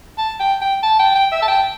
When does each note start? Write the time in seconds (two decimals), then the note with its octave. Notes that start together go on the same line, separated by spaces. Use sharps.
0.18 A5
0.40 G5
0.61 G5
0.83 A5
0.99 G5
1.15 G5
1.32 E5
1.42 A5
1.48 G5